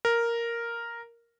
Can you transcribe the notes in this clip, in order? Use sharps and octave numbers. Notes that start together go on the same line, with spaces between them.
A#4